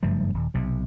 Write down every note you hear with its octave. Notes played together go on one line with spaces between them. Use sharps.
F#1 G2 F3 A3
D#1
B1 C3